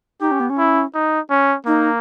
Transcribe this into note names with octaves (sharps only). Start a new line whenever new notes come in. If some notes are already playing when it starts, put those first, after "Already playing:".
D#4 G4
C#4
B3
C#4
E4
D#4
C#4
A#3 D#4